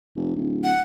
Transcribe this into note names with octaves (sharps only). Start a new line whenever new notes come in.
F1
D1
F#5